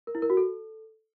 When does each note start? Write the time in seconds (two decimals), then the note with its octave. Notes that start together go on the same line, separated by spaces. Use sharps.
0.07 A#4
0.15 E4
0.22 A#4
0.30 F#4
0.37 A4